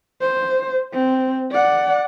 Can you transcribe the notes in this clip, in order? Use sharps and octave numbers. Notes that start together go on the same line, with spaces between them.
C5
C4
D5 F#5